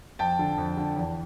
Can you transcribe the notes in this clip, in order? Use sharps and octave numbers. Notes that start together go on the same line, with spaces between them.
F2 G5 A5
D3
F2
D3
E2